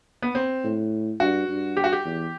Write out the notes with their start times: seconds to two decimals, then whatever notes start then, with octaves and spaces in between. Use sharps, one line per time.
0.22 B3
0.35 C4
0.64 A2
1.20 G2 F#4
1.48 G2
1.77 G4
1.84 F#4
1.93 G4
2.05 E2